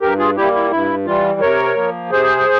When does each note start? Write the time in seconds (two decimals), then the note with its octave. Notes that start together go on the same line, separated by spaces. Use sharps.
0.01 G2 G4 A#4
0.18 F4 G#4
0.37 G3 A#3 E4 G4
0.54 E4
0.71 G2 E4
1.06 E3 G3 F4
1.40 C3 A#4 C#5
1.76 F3 A#3
2.10 C3 G#4 C5